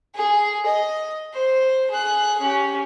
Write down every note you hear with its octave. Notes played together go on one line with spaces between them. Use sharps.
G#4
D#5
C5
G#4 F#6
C#4 G4